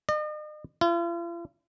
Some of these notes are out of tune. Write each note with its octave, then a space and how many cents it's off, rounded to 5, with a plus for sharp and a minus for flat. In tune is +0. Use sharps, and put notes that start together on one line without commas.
D#5 -45
F4 -45